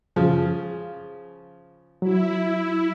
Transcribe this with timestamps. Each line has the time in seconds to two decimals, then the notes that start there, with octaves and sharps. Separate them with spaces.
0.16 C#3 F3
2.02 F#3 E4